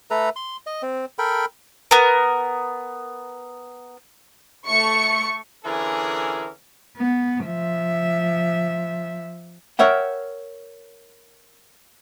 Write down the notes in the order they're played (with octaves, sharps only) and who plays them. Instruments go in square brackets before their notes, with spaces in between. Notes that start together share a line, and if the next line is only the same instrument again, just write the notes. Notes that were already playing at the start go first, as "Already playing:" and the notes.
[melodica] A3 A4 B4 A#5
C6
D#5
C4
A4 A#4 G5 B5
[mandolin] B3 A#4
[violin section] A3 C#6 C#7
[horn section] D3 E3 C#4 E4 G#4 A#4
[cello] B3
F3 E5
[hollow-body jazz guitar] A#4 C#5 E5 F#5 G5